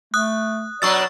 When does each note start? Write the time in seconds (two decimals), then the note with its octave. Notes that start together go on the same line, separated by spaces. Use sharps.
0.14 A3 D#6 F#6
0.82 B2 F#3 D4 D5 C#6 E6 A6